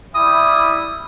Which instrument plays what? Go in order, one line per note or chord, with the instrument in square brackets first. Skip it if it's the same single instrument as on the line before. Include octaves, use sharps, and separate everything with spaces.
[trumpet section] G3 E4 [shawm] D#6